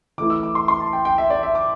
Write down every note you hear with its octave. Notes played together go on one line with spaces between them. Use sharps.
E3 A3 E4 D6
E6
D6
C6
C6
A5
G5
G5
E5
D5
E5
D6